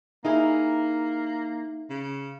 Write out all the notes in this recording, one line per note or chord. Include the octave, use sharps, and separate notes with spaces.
A#3 D#4 E4 G#4
C#3